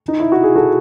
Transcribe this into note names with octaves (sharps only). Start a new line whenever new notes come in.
D#4
E4
F#4
G#4
F#4 A4